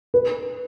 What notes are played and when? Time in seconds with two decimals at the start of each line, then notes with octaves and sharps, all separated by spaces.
0.14 B4